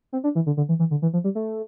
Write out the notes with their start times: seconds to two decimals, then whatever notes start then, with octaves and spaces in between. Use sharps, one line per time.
0.13 C4
0.24 D4
0.35 E3
0.46 D3
0.57 D3
0.69 E3
0.79 E3
0.91 D3
1.02 E3
1.13 F3
1.24 G3
1.35 A3